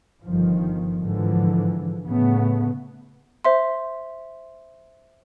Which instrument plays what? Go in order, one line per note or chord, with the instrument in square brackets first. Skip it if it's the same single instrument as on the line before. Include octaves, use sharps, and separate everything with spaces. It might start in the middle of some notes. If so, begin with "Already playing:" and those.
[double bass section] G1 D#3 F3
G#2 D3 E3 F3
A2 C#3 A3 B3
[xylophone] C5 E5 C6